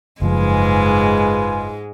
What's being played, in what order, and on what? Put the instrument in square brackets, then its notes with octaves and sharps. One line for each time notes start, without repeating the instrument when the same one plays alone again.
[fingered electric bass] F#1 F3 [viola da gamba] G#2 G#3 [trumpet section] F4 B4 G#5